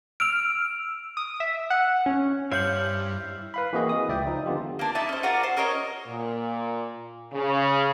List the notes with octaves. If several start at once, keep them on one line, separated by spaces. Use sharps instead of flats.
E6 F6 D7 F7
D#6
E5
F#5
C#4
G2 E4 C5 C#5 F5 G6 F#7
B4 F5 B5
E3 A#3 C4 F#4 G#4 D#5
D#6
C#2 D5 E5 G5
F3 D#4
D3 B3 F4 G4
A#3 D4
D#4 E4 D5 A5
C#4 C5
F4 F#4 A#4 D5
C5
C#4 A#4 C#5 D#5
A#2
C#3